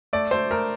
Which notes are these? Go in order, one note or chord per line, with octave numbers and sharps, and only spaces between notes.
A3 D5
A3 C5
A3 A#4